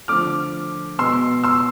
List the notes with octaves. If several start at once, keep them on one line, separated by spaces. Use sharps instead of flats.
D3 F3 A3 D6 F6
B2 G#3 B3 C6 E6
C6 E6